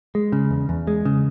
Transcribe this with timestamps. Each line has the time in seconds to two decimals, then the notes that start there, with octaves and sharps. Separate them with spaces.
0.15 G#3
0.32 C#3
0.50 E2
0.69 E2
0.87 G#3
1.05 C#3